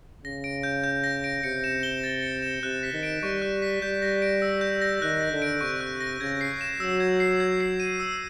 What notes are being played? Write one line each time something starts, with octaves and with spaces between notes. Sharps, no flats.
C#3 A#6
D7
G6
G6
A#6
D7
C3 C#7
E7
G7
A6
C#7
E7
C3 F#6
B6
D#3
D7
G3 C#6
F#6
B6
G3 G6
A#6
D7
E6
G6
A#6
D#3 F#6
A#6
D3
D7
C3 C#6
F#6
A#6
C#3 G#6
C7
E7
F#3 E6
G#6
C7
G#6
C7
D#7
E6